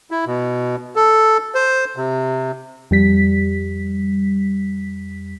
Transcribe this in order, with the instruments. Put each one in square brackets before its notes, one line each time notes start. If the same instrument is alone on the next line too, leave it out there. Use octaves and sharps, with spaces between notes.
[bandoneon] E4
B2
A4
C5
C3
[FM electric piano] F2 G3 B6